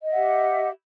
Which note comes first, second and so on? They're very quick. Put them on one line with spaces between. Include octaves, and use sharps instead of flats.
D#5 E5 F#5 G4